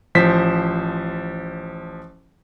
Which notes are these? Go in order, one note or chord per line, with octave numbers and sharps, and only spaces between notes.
A1 F3 C5 B6